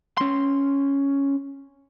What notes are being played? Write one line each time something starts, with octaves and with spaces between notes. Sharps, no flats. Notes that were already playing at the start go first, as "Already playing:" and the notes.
C#4 C6